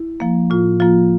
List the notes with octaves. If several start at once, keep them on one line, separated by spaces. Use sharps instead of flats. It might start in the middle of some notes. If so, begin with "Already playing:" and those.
Already playing: E4
F3 A#3
A2 F4
F3 A#3 F4